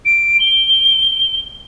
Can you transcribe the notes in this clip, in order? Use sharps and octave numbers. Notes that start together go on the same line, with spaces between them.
D7
G7